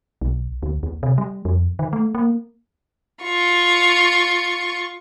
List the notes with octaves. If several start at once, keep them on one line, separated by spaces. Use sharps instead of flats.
B1
D2
D#2
C3
G3
F2
D#3
A3
A#3
F4 C#6